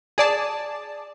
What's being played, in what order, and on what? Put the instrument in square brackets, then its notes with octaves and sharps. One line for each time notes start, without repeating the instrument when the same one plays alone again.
[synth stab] G#4 D5 A5